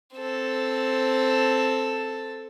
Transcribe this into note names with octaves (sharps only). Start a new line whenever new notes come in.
C4 A4